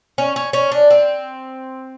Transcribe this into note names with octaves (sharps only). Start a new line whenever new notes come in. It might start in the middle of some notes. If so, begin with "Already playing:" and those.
C#4
C#4
C#4
D4
C4